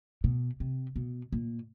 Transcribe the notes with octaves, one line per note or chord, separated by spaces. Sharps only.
B2
C3
B2
A#2